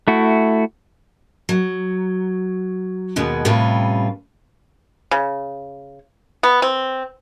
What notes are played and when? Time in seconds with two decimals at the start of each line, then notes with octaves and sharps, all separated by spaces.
0.08 A3 E4 F#4
1.49 F#3
3.16 D#2 B2 G#3 B3
3.45 A2 C3 G3 C#4 F4 B4
5.11 C#3
6.43 B3
6.62 C4